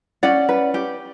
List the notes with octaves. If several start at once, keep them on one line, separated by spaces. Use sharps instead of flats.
C#4 D5 F#5
B4
G4